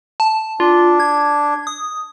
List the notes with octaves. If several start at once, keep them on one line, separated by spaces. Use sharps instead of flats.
A5
D4 F4
G#6
D#6